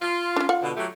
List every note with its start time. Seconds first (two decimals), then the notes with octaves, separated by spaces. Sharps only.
0.02 F4
0.36 C#4 D4
0.49 F4 F#5
0.62 B2 D3
0.77 F#3 A3 G4